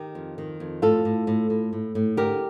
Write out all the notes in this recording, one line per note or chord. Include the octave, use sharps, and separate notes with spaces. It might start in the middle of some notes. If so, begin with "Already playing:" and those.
Already playing: D#3 G4 A#4
F2
D#3
F2
A2 F4 A4
A2
A2
A2
A2
A2
D3 G4 A#4